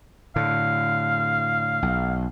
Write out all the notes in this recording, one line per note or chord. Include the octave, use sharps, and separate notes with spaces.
A2 D3 F5
B1